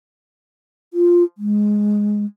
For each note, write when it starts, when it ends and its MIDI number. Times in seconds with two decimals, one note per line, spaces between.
0.94 1.23 65
1.38 2.25 56